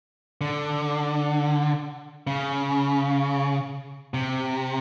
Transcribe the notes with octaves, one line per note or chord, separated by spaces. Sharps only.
D3
C#3
C3